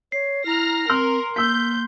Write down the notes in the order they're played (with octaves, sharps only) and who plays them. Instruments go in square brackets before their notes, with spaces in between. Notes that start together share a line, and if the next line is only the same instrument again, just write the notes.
[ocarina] C#5 [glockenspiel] C7
[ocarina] E4 [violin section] A#5 F6 A#6
[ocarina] C4 [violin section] A#4 [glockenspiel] C6 [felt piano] F6
[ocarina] A#3 [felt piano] E6 B6 [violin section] G6